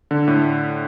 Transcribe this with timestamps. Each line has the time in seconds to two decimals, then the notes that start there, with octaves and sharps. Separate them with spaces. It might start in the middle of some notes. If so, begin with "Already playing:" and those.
0.11 D3
0.28 A2